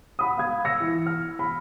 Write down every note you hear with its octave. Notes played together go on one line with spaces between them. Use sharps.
F#5 B5 D#6
F5 G#6
E6 A#6 C#7
E3
F6
B5